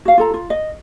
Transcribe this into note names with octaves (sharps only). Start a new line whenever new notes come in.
F#4 F5
F4 A4 A#5
F4
D#5